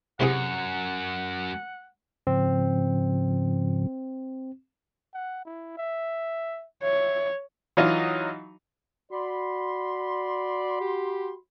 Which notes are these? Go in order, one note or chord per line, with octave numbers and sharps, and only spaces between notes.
F#2 C3 E4 G#4 F#5
G#2 C#3 F3 C4
F#5
E4
E5
C#5 E5
E3 F#3 D#4 F4 D#5
F#4 D5 B5 C6
G4